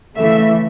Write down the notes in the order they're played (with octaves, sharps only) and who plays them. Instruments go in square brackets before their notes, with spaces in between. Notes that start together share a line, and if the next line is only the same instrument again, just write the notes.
[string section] C#3 E3 A3 E5